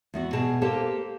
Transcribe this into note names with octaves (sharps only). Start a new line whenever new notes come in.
E2 B3 F#4
B2 G#4 A5
A#3 G4 A4 A#4 C5